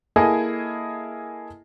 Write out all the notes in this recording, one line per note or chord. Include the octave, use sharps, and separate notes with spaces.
A#3 E4 G#4 A4 D#5 G#5